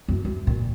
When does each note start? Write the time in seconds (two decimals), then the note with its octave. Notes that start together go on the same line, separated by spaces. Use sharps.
0.08 F#2
0.25 F#2
0.47 A#2